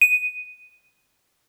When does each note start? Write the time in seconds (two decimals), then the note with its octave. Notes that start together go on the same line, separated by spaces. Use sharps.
0.01 D#7